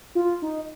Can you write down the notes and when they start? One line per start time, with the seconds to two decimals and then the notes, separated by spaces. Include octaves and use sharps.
0.15 F4
0.42 D#4